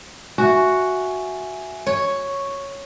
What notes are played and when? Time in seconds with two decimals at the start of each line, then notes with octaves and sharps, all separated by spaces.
0.38 F#4 E5 G#5
1.86 C#5